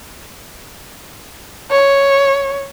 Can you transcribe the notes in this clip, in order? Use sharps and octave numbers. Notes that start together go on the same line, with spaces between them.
C#5